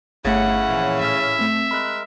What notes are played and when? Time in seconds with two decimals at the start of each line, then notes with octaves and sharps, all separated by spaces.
0.25 G1 C#3 A3 C#4 E4 F#5 C#7
0.69 A#2 E3 F3
1.00 A2 E5 F6
1.39 A3 C4
1.71 G#3 A#4 B5 F#6